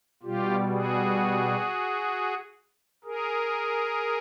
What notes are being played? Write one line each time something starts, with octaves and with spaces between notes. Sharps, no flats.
B2 G3 F4 G4
F#4 G#4
G#4 A#4